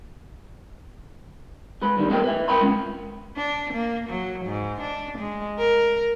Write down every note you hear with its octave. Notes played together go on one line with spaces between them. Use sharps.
G#3 B4
G2 D#3 G3
A3 B3 A4 A#4 D#5 G5
B4 E5
A#4 G5 B5 C6
G#3 C#4
D4
A#3
F#3
G#2
D4
G#3
A#4